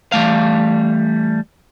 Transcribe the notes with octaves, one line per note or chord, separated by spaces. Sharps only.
E3 G3 A3 F5